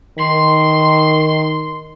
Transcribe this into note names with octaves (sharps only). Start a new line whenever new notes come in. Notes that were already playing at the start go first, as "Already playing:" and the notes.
D#3 C6